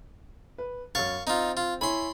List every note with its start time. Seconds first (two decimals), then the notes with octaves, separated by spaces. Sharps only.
0.58 B4
0.95 F#2 C#5 F5 C#6 A6
1.27 C4 D#4 F4
1.57 F4
1.81 E4 C#5 G#5 B5 C6